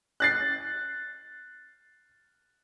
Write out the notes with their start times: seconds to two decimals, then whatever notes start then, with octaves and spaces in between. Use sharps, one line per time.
0.20 F#6 A6 C7